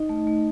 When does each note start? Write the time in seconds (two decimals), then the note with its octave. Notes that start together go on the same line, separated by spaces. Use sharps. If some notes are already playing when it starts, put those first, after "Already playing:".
Already playing: D#4 D#5
0.09 A3
0.27 A3